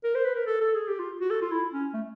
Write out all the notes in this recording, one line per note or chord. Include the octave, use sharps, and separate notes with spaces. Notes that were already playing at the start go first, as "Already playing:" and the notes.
A#4
C5
B4
A#4
A4
A4
G#4
G4
F4
F#4
A4
F4
E4
C#4
A3